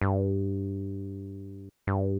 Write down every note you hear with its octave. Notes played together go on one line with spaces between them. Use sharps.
G2
G2